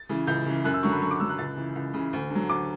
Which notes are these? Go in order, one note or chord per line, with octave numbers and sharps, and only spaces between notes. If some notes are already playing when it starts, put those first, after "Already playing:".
Already playing: A6
C#3 E3
C#2 G6
C#3 E3
F#2 F#6
E6
D3 F#3 C#6
B5
F#2 C#6
D6
D3 F#3 E6
F#6
C#2 A6
C#3 E3
C#2
C#3 E3
D2
D3
F#3
D2 D6